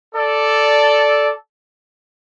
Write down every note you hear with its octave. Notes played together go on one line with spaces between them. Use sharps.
A4 D5